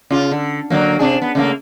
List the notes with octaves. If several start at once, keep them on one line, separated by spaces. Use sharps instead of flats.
C#3 F4
D3
D3 F#3 A#3
C3 D4 G#4
B3
C#3 A3 A#3